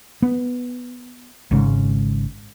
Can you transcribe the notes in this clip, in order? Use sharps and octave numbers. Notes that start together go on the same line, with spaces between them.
B3
G#1 G#2 C#3